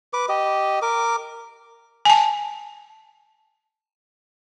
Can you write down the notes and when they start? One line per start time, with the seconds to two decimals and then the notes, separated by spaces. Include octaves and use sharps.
0.13 B4 D6
0.29 G4 D#5
0.82 A#4 D6
2.05 G#5 A5